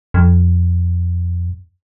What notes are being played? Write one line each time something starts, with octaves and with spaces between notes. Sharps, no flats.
F2